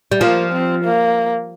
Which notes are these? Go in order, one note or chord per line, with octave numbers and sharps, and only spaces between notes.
G3
F3 A#3
C4
A#3